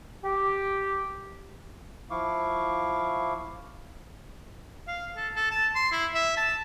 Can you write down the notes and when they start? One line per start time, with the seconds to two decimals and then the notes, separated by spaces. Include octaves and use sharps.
0.24 G4
2.11 F3 E4 F5 C#6 D6
4.87 F5
5.16 A4
5.36 A4
5.51 A5
5.75 C6
5.92 E4
6.14 E5
6.37 A5